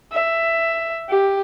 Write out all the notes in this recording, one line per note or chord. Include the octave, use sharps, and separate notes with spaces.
E5
G4